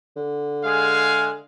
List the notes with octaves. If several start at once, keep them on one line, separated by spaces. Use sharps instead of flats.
D3
G#3 G#4 F5